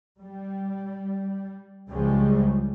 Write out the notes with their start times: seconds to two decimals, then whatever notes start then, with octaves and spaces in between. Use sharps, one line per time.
0.18 G3
1.91 C#2 C#3 F3 G3 G#3